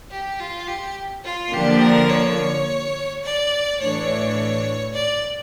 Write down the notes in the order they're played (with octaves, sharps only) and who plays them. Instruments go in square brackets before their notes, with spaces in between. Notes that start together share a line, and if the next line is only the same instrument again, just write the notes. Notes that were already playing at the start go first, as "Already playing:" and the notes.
[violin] G4
F4
G4
F4
[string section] D3 F3 A#3 D4 [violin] G4
[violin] A#4
C#5
D5
[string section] A2 E3 A3 D4 [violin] C#5
[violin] D5